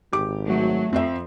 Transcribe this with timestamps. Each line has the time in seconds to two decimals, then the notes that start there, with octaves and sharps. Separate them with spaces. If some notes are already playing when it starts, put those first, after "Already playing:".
0.13 G#1 G4 D6
0.47 F#3 A3
0.93 F2 C4 C5 E5